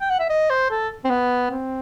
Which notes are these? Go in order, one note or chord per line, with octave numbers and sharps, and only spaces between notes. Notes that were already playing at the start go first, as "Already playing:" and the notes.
G5
F#5
E5
D#5
C5
A4
C4
B3
C4